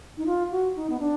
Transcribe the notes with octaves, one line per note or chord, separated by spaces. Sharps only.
D#4
F4
F#4
D#4
B3
D4